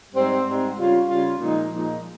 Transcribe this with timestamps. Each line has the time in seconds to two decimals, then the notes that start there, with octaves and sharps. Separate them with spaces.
0.13 G#2 G3 C4
0.44 G#2 G3 C4
0.76 C#3 G3 C#4 F4
1.08 C#3 G3 C#4 F4
1.39 A#2 F3 G#3 D#4
1.70 A#2 F3 G#3 D#4